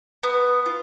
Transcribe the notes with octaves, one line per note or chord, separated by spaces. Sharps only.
B3
F4